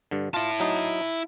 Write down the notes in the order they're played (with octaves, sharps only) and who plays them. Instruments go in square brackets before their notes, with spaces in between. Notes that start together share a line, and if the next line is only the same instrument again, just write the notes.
[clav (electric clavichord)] G2 D3
[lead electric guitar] E4 A5 [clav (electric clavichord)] F4
[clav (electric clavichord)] F#3 D#4